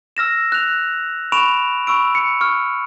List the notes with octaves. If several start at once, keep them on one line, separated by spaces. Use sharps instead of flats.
E6 F6 A#6 E7
F#6 F7
B5 C#6 D7 E7 F7
B5 C#6 E6 D7
C#7
C#6 F6